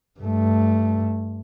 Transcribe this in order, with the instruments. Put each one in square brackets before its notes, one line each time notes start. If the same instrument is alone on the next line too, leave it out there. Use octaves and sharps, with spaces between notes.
[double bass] G2 A3